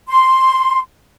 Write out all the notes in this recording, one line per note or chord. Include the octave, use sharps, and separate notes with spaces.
C6